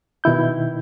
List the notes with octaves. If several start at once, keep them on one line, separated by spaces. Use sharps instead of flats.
B2 D#3 E4 G6